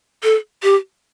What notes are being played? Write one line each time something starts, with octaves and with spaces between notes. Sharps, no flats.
A4
G4